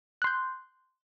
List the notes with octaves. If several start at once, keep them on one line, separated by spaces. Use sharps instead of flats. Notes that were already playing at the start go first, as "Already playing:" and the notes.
C6 F#6 G6